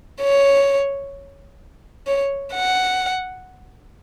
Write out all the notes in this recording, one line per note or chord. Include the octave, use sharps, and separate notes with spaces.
C#5
C#5
F#5